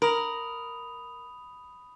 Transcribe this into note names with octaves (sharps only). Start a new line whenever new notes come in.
A#4 B5 D#6 F7